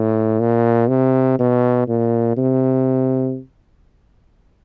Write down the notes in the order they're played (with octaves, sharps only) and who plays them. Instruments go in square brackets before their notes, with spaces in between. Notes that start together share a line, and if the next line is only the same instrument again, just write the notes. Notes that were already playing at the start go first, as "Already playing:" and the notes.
Already playing: [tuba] A2
A#2
C3
B2
A#2
C3